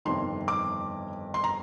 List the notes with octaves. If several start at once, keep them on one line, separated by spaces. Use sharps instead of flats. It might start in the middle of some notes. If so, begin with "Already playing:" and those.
G1 F2 C3 D#3 C6
D6
C6
A#5